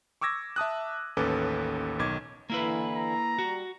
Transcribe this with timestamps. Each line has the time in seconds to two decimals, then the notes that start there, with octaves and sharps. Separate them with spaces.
0.21 C#6 D6 E6 G#6 A#6
0.56 E5 A5 D#6 F#6
1.17 A1 D#2 C#4 A4 B4 D6
1.99 B1 D#3 D6 G#6
2.50 D3 E3 A#3 E4 B4
2.93 A#5
3.39 G3 F#4